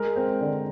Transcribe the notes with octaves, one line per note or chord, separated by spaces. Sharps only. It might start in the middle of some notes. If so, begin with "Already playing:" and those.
Already playing: G#3 A#4
C4
D3